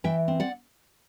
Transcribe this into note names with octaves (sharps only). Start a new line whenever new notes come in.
E3 E5 G5
C4
D5 F#5